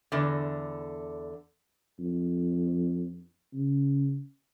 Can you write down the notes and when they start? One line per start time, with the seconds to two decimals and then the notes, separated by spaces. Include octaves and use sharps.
0.12 E2 D3
1.99 F2
3.54 C#3